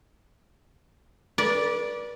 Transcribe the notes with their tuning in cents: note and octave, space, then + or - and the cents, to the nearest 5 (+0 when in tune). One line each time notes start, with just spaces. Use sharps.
B4 -40 D5 -5